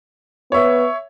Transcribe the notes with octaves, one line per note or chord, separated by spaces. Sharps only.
B3 C#5 E5